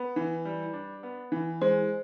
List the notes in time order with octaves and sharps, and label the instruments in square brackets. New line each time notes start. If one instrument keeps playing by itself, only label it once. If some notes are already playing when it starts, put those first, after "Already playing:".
Already playing: [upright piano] B3 [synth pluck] B4
[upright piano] E3
G3
D4
B3
E3
[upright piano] G#3 [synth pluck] C5